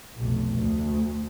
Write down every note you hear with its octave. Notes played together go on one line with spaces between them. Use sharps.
F1 B1
D2